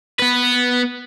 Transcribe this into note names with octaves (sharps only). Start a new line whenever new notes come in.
B3 B4